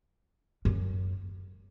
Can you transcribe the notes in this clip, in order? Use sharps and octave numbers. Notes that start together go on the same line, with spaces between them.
F#2